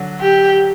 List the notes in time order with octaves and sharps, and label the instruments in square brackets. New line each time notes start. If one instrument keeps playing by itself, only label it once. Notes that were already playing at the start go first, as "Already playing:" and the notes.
Already playing: [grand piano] D3 F#3
[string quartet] G4